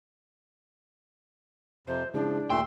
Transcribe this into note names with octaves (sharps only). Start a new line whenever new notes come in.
F2 C3 C5
C#3 F3 G#3 D4 E4
D#2 A#2 A3 G5 C6 E6